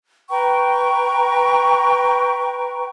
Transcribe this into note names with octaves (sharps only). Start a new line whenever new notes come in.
B4 G5 A#5 C#6